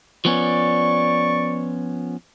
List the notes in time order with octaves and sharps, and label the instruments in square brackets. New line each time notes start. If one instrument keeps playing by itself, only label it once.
[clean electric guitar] F3 B3 C#4 [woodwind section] D5 C#6